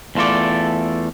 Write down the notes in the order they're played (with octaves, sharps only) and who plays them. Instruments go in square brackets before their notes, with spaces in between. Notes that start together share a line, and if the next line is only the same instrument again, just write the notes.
[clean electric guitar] E2 A3 F4 A4 D5